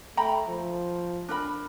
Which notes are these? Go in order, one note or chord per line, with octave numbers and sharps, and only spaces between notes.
A3 G5 A#5 B5
F3
D4 A#4 B5